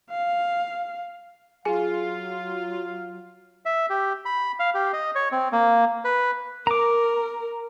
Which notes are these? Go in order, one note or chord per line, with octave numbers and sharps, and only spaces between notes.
F5
F#3 F4 G#4 F5 G#5
E5
G4
B5
F5
G4
D#5
C#5
C4
A#3
B4
A#4 A#5 D6